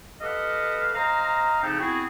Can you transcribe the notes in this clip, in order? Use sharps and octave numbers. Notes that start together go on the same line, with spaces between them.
G4 A4 B4 D#5 F5 F#5
C5 D#5 F5 A#5
C#3 F3 C4 D#4 G4 A4
B3 C4 E4 F#4 G#4